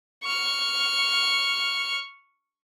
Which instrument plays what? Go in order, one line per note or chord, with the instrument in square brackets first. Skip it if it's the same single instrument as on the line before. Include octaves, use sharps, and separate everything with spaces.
[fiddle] C#6 F6